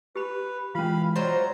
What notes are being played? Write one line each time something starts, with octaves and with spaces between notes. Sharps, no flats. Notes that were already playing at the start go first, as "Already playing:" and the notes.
G4 B4 B5
E3 G#3 C#4 F4 F5 B5
F#3 C5 D5 D#5 A#5